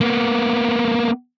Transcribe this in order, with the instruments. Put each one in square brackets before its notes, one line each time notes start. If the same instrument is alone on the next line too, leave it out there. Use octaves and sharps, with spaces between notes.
[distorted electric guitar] A#3 B3